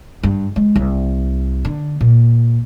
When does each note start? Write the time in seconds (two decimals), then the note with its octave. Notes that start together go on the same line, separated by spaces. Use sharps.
0.23 G2
0.56 G#3
0.76 C2
1.65 D3
2.01 A#2